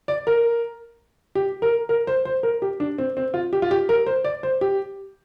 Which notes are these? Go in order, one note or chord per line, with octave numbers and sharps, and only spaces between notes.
D5
A#4
G4
A#4
A#4
C5
C5
A#4
G4
D4
C4
C4
F4
G4
F4
G4
A#4
C5
D5
C5
G4